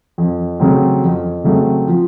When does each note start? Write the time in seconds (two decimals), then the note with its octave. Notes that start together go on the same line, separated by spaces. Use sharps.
0.18 F2
0.60 C#3 F#3 A3 C4
1.03 F2
1.44 C#3 F#3 A3 C4
1.88 F3